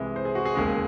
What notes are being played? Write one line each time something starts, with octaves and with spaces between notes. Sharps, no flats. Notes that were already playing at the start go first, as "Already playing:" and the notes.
Already playing: C2 C3 E3 G#3
C5
G#4
F#4
G#4
E1 D#2 C#3 G#3